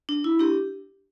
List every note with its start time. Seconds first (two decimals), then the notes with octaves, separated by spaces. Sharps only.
0.09 D4
0.24 E4
0.39 D4 G4